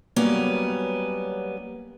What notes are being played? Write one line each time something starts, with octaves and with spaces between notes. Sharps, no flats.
F#3 G3 A#3 B3 C#4